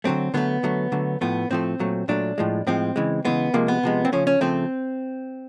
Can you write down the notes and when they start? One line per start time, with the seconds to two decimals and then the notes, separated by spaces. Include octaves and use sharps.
0.04 D3 F#3 A3 C4
0.34 D3 F#3 A3 B3
0.63 D3 F#3 A3
0.92 D3 F#3 A3
1.21 A2 F3 A3 B3
1.50 A2 F3 A3 C4
1.80 A#2 F#3 A3
2.08 A#2 F#3 A3 D4
2.38 A2 F3 G#3
2.67 A2 F3 G#3 C4
2.96 C#3 E3 G#3
3.25 C#3 E3 G#3 B3
3.54 C3 F3 G#3 A#3
3.68 B3
3.83 C3 F3 G#3
4.05 C4
4.12 C#3 F3 A3 C#4
4.27 C#4
4.41 C#3 F3 A3 C4